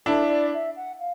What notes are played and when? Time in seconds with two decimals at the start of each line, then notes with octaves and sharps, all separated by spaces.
0.06 D4 E4 A4
0.29 D5
0.53 E5
0.75 F#5
0.99 F5